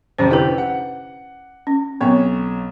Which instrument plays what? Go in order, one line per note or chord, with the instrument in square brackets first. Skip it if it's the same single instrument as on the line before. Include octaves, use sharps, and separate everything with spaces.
[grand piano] G#1 F2 C3 [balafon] C#4 C5
[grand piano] D3 G4 [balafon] E4 B4
[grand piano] F#5
[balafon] C#4
[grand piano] B1 C#5 [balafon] B3 C4